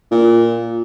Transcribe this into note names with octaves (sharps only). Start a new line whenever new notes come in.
A#2